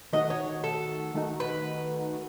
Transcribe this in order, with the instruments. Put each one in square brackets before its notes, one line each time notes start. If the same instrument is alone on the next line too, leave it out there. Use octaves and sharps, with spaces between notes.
[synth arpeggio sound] D#3 A3 D#4 F#4 [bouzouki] D#5
[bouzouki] C#5
A4
[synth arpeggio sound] D#3 A3 D#4 F#4
[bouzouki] B4